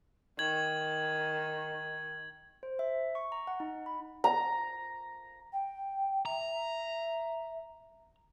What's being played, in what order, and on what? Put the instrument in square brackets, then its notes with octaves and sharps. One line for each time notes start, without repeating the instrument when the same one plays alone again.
[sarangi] D#3 [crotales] G#6 F#7
[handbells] C5
E5
C#6
A#5
F#5
D#4
B5
[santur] A#5
[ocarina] G5
[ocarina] E5 [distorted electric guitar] A#5